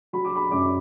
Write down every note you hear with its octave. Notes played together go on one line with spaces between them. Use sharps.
F#3 B5
D6
B5
F#2 D6